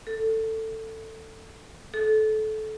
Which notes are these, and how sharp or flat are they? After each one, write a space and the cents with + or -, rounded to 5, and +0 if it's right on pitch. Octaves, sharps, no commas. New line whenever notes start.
A4 +15
A4 -25